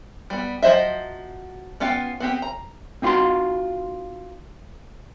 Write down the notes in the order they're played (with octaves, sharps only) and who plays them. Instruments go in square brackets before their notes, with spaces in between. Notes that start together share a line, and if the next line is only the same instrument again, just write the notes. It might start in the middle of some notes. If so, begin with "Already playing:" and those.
[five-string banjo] G3 B3
F3 F#3 C5 D#5 E5
B3 C#4 F4 F5 G5
B3 C4 G4
A#5
[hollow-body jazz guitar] C4 D#4 F4 F#4 F5 C6